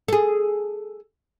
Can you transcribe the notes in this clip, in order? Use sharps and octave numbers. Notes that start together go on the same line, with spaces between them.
G#4 A4